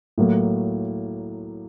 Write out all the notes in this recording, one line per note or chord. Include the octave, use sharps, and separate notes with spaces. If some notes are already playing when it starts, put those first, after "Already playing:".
A2 F#3 A#3